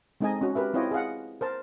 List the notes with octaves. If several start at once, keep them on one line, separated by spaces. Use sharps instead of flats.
G#3 C4 D#4 A4 D#5 G#5
C#4 F#4
G4 A#4 B4 E5
C4 E4 F4 C#5 D#5 G5
G#4 D#5 F5 F#5
A#4 C5 A5